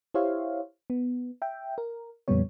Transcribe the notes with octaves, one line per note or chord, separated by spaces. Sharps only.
E4 G4 C5 C#5 E5 F5
B3
E5 G5
A#4
F2 A#2 C#3 G3 B3 C#5